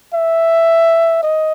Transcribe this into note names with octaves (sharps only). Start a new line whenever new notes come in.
E5
D#5